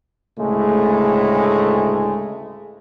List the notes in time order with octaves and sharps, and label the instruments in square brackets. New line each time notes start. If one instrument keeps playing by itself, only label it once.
[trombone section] D2 A2 C#3 G#3 A3